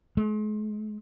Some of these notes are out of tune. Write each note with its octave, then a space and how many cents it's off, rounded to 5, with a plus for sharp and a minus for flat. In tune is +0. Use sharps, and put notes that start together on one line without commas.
G#3 +40